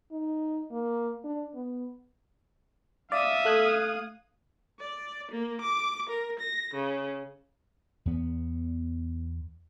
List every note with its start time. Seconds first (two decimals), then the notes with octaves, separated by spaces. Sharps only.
0.12 D#4
0.72 A#3
1.24 D4
1.55 B3
3.12 D5 E5 F5 D#6
3.45 A3 F#6 G#6
4.80 D5
5.32 A#3
5.61 D6
6.09 A#4
6.40 A#6
6.74 C#3
8.06 E2 B3